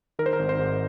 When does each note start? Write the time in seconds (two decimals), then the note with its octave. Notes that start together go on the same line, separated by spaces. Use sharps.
0.19 D#3 A#4
0.26 C5
0.33 A#4
0.39 G#1
0.49 C5
0.59 G#2